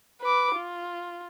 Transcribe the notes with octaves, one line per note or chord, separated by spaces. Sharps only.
B4 D6
F4